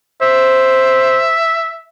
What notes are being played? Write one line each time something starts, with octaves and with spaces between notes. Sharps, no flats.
C5 E5